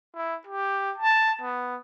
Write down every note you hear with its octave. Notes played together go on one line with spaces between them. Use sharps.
E4
G4
A5
B3